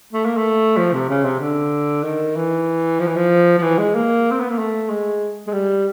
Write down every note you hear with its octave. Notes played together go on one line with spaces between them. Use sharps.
A3
A#3
A3
F3
C3
C#3
C3
D3
D#3
E3
F3
E3
F3
F3
E3
G#3
A#3
C4
B3
A#3
A3
G#3
G#3
G3